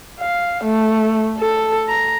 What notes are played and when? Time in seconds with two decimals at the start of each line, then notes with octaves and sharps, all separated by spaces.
0.20 F5
0.64 A3
1.39 A4
1.89 A#5